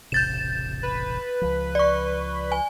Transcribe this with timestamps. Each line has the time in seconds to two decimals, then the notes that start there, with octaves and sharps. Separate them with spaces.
0.12 E1 A1 C3 G6 A6 E7
0.83 B4
1.42 C#2 F3
1.75 D5 C#6
2.52 G#5